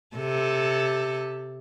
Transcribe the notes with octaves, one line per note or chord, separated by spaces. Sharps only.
C3 A4